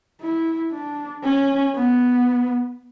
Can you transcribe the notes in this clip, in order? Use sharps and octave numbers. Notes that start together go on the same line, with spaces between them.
E4
D4
C#4
B3